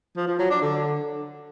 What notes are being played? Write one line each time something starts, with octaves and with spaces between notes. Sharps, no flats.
F3
F3
F#3
D4
D3